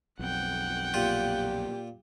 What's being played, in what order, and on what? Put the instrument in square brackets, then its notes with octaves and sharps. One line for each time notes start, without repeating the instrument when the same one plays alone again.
[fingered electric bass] B1 F2 [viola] F#5 G5
[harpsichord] A#2 F4 [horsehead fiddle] G4